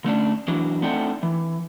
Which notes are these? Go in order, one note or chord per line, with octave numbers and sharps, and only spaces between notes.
D3 A3 C#4 D4
E3 F#3 D4
A3 C4 D4 D#4 F#5 G5
E3